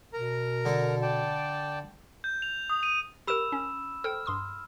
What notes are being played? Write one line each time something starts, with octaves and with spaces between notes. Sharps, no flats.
B2 A#4 A#5
D3 A4
D5 G5 A5
G6
F7
D#6
D#7
G4 A#4 B5 E6 E7
C#4
A4 C5 G5 F6
G2 C6 D#6